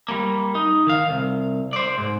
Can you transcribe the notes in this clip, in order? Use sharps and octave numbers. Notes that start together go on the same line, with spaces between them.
G3 A#3
D#4
D#3 F5
C2
C5 D5
G#2